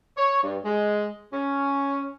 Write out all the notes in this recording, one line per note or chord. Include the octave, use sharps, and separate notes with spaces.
C#5
G2
G#3
C#4